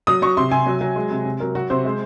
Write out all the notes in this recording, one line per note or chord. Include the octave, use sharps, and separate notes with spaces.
F#3 D#6
F#3 C#6
C3 C6
C3 G#5
F#3
F#3
G#3
C3
C3
F#3 A#4
F#3 F#4
C3 C5
G#3